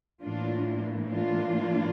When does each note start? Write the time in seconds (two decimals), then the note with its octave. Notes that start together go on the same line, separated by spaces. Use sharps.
0.21 A2 E3 A#3 D4 F4
1.09 D4 F4